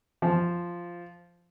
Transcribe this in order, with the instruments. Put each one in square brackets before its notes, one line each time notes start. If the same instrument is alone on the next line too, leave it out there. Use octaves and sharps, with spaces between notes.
[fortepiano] F3